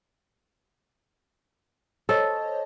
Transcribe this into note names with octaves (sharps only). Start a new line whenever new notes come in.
A4 C5 C#5 D#5